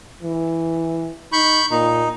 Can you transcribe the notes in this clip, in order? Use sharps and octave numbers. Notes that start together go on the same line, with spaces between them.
E3
D#4 B5 C#6 G6
A#2 D#4